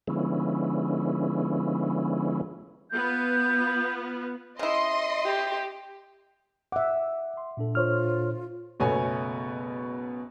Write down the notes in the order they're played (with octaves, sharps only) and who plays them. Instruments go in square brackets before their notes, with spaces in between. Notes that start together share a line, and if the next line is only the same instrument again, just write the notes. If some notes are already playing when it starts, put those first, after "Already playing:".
[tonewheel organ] D3 F3 G#3 B3 C#4 E4
[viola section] B3 F4 B4 [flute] G6
[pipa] C#3 E4 [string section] D#5 C6
[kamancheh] G4
[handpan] E5 F#5 [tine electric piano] D6
[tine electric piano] C6
A#2 D4 A4
[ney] F4 [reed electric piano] C5 C#5 F6
[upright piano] F#1 B2 A3 B3 C#5 G#5